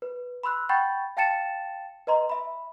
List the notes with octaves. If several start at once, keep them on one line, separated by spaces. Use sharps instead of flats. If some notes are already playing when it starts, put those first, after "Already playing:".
B4
B5 C6 E6 F#6
F#5 G5 B5 C#6 G6 A6
F5 G5 A5 A6 C#7 E7
B4 D#5 A#5 C6
E5 B5